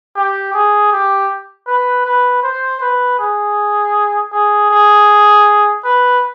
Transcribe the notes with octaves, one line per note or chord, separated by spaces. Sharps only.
G4
G#4
G4
B4
B4
C5
B4
G#4
G#4
G#4
B4